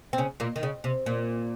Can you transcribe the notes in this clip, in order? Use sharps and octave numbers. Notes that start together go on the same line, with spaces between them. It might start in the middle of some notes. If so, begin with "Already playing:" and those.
C4
C#3 C#4
A#2 A#3
D#3
C#3
C3
A#2